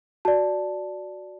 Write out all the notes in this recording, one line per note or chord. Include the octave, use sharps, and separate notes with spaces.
F#4 D5 A5